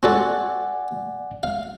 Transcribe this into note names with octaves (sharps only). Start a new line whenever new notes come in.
C4 F#4 A4 D5 F#5 G#5
F5